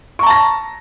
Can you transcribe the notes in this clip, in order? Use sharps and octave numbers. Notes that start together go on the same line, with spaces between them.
A5 A#5 C#6 A#6